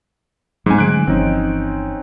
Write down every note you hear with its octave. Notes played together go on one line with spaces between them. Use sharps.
G#2 F#3 C4 G#5
D3 F#3 A3 F#6 D7
G1 E3 F3 C4 C#4 D#4